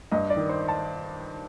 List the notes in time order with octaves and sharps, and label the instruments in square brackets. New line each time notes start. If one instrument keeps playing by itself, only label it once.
[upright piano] G2 D#5
D5
D#3
C5
A5